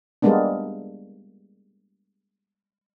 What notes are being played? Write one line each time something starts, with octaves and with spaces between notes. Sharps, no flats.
G3 G#3 A#3 B3 D4